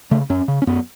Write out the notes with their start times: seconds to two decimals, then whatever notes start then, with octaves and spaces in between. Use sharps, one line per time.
0.11 C#3 A3
0.30 F#2 C#4
0.48 C#3
0.62 C#4
0.67 F#2 B3